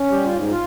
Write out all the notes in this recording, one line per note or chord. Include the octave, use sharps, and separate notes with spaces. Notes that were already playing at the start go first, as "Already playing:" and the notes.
Already playing: C#4
G3 G4
F4
G#2
F4